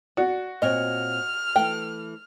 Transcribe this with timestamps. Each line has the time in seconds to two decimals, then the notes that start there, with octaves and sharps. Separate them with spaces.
0.17 F#4 D5
0.62 A#2 C4 C#5 D#5 F6
1.56 E3 A3 G5